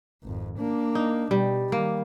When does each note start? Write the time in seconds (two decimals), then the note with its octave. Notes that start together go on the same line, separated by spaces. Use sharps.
0.23 G#1 F2
0.58 A#3 D4
0.95 D#4
1.31 B2 G3
1.72 D#3 G3 A#3